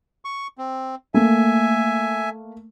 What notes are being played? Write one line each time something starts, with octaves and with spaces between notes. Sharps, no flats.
C#6
C4
A3 A#3 E5 G#5